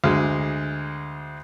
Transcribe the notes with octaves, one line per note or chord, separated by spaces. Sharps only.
D2 G#3